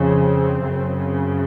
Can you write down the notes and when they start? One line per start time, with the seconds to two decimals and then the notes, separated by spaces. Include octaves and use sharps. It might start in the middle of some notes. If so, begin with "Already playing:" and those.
Already playing: F2 C#3 C4
0.62 F#2 C#3